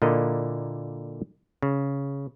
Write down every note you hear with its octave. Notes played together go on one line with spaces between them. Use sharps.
A#2 D3 A#3 E4 D#5
C#3